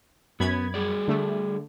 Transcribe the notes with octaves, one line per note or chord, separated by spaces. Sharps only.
F#2 B3 B5 G#6
G3 G#4 D5
D3 A3